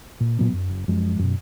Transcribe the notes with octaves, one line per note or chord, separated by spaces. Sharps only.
A#2
A#2 F#3 B3
F#2
F#1
F#2 F3 G#3
F#2 B2